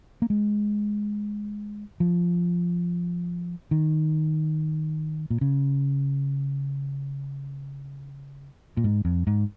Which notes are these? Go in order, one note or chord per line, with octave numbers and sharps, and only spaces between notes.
A#3
G#3
F3
D#3
A#2
C#3
A#2
G#2
F2
G#2